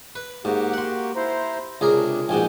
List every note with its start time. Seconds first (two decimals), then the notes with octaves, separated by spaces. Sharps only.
0.16 B4
0.45 G#2 A#3 F#4 G4
0.73 F#5 C6
1.16 E4 C5 A#5
1.81 C#2 C3 D4 G#4 A#4
2.29 A#1 G#2 B2 G5 G#5